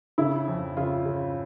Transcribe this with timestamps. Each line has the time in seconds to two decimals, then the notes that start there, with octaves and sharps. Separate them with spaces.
0.18 C#3 E4
0.48 F2
0.77 C#3 F4
1.05 C#3